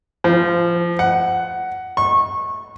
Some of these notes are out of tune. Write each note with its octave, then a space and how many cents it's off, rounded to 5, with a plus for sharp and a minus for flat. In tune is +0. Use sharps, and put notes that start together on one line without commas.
F3 -20
F#5 +10
C#6 -25